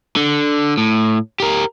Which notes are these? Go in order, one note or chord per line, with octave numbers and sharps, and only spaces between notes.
D3
A2
G4 A#4